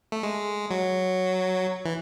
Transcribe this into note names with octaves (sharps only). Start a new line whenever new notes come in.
A3
G#3
F#3
E3